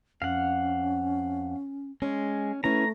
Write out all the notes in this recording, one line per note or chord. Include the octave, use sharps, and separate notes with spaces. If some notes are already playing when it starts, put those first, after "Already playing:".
F2 C#4 F5 F#5
G#3 C#4
A3 C#4 E4 B4 A#5